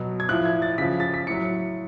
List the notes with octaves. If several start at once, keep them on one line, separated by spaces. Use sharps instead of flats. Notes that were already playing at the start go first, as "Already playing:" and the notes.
Already playing: B2 F#3
G#6
A2 F3 F#6
G#6
A6
C#3 F3 B6
A6
B6
A2 F#3 C#7